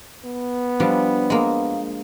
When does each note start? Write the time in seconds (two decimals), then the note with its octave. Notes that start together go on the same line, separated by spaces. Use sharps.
0.24 B3
0.80 F3 G3 D4
1.30 G#3 A#3